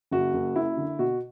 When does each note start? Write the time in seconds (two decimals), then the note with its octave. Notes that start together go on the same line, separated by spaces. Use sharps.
0.11 F#1 F#4
0.34 F#1
0.55 F#2 E4
0.77 D3
0.99 B2 F#4